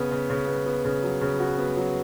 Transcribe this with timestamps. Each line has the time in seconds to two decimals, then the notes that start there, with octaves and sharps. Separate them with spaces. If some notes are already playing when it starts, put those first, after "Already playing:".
Already playing: C#3 B3
0.11 C#3
0.30 C#3
0.47 B3
0.66 B3
0.84 C#3
1.03 F#3
1.21 C#3
1.40 F#4
1.58 B3
1.77 F#3